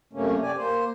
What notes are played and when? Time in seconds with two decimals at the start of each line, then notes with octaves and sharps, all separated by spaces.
0.13 F#2 C3 A3 A#3 C#4
0.43 G4 D5 G#5
0.57 A#3 C5